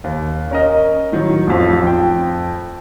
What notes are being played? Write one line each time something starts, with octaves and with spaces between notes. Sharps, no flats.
D#2
C#4 A#4 D#5
A2 D#3 F#3
A1 F2
F2 G5